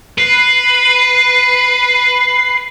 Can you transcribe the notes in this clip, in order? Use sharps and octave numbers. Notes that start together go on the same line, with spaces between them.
B4 C7